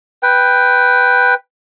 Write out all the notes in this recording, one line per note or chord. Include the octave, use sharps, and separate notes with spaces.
B4 G5